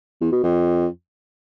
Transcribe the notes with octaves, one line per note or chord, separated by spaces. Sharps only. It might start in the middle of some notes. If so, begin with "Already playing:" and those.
E2
B2
F2